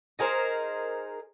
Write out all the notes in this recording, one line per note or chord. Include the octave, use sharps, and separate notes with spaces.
D#4 G#4 A#4 C5